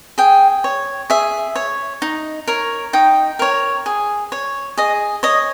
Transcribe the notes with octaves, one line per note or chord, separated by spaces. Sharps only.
G#4 G5
C#5
G#4 E5
C#5
D#4
A#4 C#5
D#4 G5
A#4 C#5
G#4
C#5
G#4 D#5
C#5 D#5